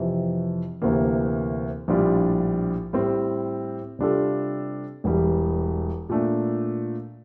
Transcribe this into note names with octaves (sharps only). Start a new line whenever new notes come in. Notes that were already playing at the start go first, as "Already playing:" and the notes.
Already playing: F2 C3 E3
D2 C3 E3 A#3
A#1 A2 G3 D4 F4
A2 G3 C4
C3 G3 D4 F4 A4
E1 E2 E3 G3
A#2 A3 D4